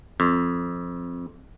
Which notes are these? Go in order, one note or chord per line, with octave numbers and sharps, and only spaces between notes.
F2